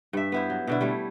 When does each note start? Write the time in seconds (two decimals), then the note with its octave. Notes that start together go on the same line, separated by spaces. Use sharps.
0.13 G2 E5
0.32 B3 E4 C5
0.50 F#3
0.67 B2 D3 E4
0.81 G3 A3 C#5